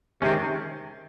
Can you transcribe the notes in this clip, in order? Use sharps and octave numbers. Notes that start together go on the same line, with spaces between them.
C3 D#3 G#3 C#4